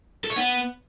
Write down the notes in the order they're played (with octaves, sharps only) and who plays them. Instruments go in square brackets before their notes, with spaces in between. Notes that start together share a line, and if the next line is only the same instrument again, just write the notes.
[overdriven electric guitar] A4
C#5
B3